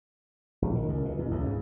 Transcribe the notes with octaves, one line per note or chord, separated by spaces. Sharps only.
A#1
D#3
C#2
B2
E2
C#2
G#2